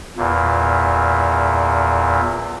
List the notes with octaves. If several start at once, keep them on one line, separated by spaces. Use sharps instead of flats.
E2 A#2